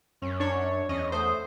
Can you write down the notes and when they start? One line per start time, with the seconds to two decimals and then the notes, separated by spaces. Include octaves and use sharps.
0.22 F#2 C#4
0.40 D4 C#5
0.89 E2 C#4 D#5
1.12 A3 C5 D#6